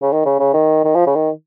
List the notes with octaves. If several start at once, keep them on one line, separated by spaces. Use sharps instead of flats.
C#3
D#3
C#3
C#3
D#3
D#3
F3
C#3
D#3